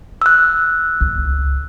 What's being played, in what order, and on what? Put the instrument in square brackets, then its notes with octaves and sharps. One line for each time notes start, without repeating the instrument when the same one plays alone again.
[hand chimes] E6 F#6
[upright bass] C#2